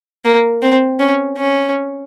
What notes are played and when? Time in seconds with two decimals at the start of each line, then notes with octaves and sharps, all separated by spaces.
0.25 A#3
0.62 C4
1.00 C#4
1.37 C#4